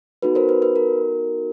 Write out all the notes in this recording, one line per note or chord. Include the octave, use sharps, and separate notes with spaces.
B3 D#4 F#4 A4 B4
A#4 C5
B4
B4
A#4